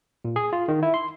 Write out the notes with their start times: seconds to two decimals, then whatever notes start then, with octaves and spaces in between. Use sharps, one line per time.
0.25 A#2
0.36 G#4
0.53 F4
0.68 D#3
0.83 E4
0.94 C6